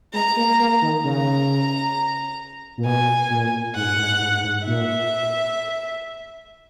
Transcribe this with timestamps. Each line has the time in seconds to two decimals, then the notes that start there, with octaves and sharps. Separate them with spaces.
0.14 G#3 A#5
0.36 A#3
0.60 A#3
0.82 D#3
1.04 C#3 A#5
2.77 A#2
2.85 B2 G#5
3.30 A#2
3.76 G#2 F#5
3.99 G#2
4.21 G#2
4.44 G#2
4.66 A#2 E5